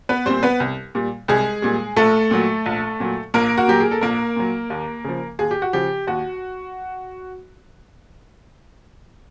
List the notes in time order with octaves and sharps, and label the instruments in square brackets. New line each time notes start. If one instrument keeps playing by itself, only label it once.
[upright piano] B3 B4
A#2 G3 C4 C5
B3 B4
C2
A#2 G3
C2 G#3 G#4
A#2 G3
A#1 A3 A4
A#2 F#3
A#1
A#2 F#3
A#1 A#3 A#4
F#4
A#2 F#3 G4
G#4
A4
A#1 A#3 A#4
A#2 F#3
D#2
C#3 F3
D#2 G#4
G4
F#4
C#3 F3 G4
D#2 F#4